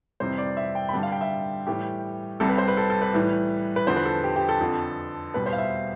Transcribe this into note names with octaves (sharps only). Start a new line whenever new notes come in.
F2 C3 E3 G3 C5
D5
E5
G5
B5
G2 D3 G3 A5
F5
G5
E5
A2 E3 G3 G4
C2 C3 G3 A4
B4
C5
B4
A4
A4
B4
A2 E3 G3
B4
E2 D3 F3 C5
B4
A4
G4
G4
A4
F2 D3 F3
E2 B2 G3 B4
C5
F5
E5